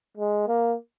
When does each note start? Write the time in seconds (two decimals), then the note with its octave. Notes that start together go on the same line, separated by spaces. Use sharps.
0.17 G#3
0.48 A#3